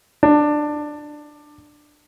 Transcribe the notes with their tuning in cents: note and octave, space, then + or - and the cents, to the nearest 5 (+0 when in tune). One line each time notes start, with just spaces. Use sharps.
D4 +15